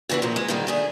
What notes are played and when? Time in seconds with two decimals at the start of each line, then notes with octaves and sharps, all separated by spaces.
0.09 A#2 C#3 E3 D4 F#4
0.22 A#2 F3
0.36 G#3
0.48 G#2 D3 D#3 G3 A#3
0.67 A3 D4 G#4